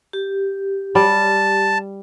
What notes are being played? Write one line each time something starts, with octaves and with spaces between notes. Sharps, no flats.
G4
G3 A5